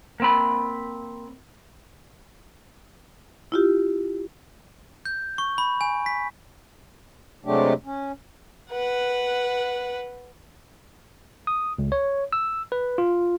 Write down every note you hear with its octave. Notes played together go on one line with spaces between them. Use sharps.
A#3 C4 B5
E4 F4 G4
G6
C#6
B5
G#5
B6
C3 F#3 G#3 A3 D4 G4
C#4
B4 F#5
D#6
C#2
C#5
E6
B4
F4